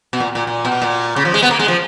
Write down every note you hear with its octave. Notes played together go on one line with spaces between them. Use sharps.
B2
A#2
A#2
A#2
B2
A#2
C#3
F3
G#3
B3
A#3
G#3
F3